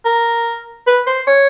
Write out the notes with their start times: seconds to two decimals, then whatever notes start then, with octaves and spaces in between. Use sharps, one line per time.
0.05 A#4
0.87 B4
1.07 C5
1.27 C#5